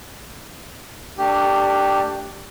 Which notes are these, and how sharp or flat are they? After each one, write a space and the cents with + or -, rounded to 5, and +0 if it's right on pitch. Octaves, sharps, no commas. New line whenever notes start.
A3 +40 D4 +10 G4 +0